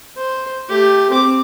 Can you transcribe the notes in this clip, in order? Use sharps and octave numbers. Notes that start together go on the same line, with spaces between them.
C5
A3 G4
C4 D6